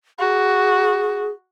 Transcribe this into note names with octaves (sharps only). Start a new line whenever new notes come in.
F#4 G#4